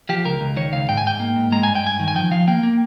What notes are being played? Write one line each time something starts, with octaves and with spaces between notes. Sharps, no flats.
F3 G4
C#2 A#4
C#2
D#3 C#5
C#2 F5
G#2 G5
G#5
G#2 G5
A#3
G#2
G#3 A#5
G2 G#5
G5
G2 G#5
D#3
G#5
F3 G5
F3 F5
A#3 G5
A#3